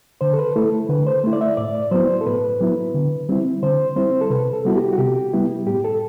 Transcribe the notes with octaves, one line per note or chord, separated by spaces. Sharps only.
D3 C5
A4
B4
A3 E4 A4
D3 B4
C5
A3 E4
D5
E5
A2 D5
F#3 B3 E4 C5
A4
A2 B4
F#3 B3 E4
D3
G3 C4 E4
D3 C5
G3 C4 E4 C5
A4
C3 B4
A4
G3 B3 E4 F#4
G4
F#4
C3 G4
G3 B3 E4
A2 G4
A4